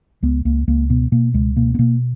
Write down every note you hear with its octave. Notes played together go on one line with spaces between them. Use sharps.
C#2 B3
C#2 A#3
C#2 A#3
B2 B3
B2 A#3
C#2 G#3
B2 A#3
B3
B2 A#3